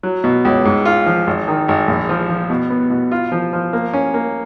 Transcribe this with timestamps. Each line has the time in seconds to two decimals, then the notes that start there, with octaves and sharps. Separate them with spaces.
0.03 F#3
0.24 B2
0.45 C#2
0.65 G#2
0.85 F4
1.06 F3
1.27 G#1
1.48 D#3
1.68 G#1
1.88 A#1
2.09 F3
2.29 F3
2.50 B2
2.70 B3
2.90 B2
3.12 F4
3.32 F3
3.53 F3
3.73 A#3
3.93 C#4
4.14 A#3